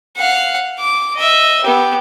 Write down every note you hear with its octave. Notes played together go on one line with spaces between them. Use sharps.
F5 F#5
D6
D#5 E5
B3 G4